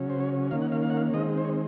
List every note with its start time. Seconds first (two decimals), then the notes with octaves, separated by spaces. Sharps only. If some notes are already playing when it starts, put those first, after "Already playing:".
Already playing: C#3 F#3 C#4
0.10 C5
0.20 C#5
0.51 D#3 A#3 C#4 F5
0.62 F#5
0.72 F5
0.82 F5
0.90 F#5
0.97 F5
1.14 D#3 G#3 C4 D#5
1.38 C5
1.45 C#5